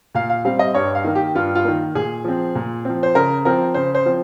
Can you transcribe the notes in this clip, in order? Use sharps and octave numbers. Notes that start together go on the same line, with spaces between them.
A#2 F5
F5
G3 C4 F5
D#5
G2 C#5
F5
D#3 A#3
G4
G2 F4
F4
D#3 A#3
A#2 G#4
F3 C4
A#2
F3 C4
C5
C#3 A#4
F3 C4 A#4
C#3 C5
C5
F3 C4